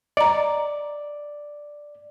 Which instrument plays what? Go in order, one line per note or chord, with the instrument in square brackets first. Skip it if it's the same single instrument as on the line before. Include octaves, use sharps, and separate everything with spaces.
[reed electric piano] D5 [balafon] D#5 A#5